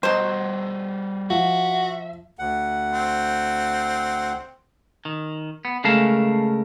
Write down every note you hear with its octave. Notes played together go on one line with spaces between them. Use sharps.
B2 G3 F#4 C5 A#5
F3 F#4 E5
D2 F#5
C4
D#3
B3
C#3 G#3 A3 A#4 F5 A5